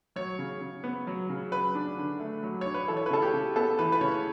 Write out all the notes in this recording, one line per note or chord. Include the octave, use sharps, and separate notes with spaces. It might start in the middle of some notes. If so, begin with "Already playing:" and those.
F#3 C#5
C#3
C#3
B3
F#3
C#3
F#3 B4
D4
D3
A3
F#3
D4 C#5
B4
E3 A4
C#5
B4
C#3 A4
G4
C#3
B3 A4
E3 B4
B4
C#3 C#5